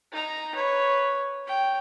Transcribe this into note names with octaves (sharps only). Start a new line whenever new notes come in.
D#4 A#5
B4 C#5
C#5 G5